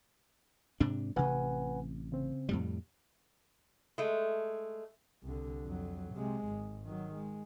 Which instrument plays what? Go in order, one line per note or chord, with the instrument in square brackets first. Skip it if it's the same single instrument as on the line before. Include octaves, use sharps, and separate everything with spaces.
[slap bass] G#2 C3 D4
[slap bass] A1 C3 [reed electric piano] B4 F#5 G#5
[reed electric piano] C#3 C4
[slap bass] F2 A2 G3
[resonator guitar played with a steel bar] G#3 A3
[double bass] C2 D3
F2 F#3
C3 G#3
G#1
D#3 F#3
G#3